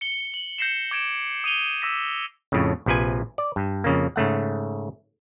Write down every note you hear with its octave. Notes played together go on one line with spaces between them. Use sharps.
C#7 G7
F#7
G6 A#6 C7 C#7 E7
D6 G#6 D7 E7
D#6 D#7 F7 G7
D6 E6 A#6 B6 E7
F2 A2 C#3
A#1 C3 F3 B4 G#5
D5
G2
F2 C#3 A#3
G#2 C#3 A3 F#5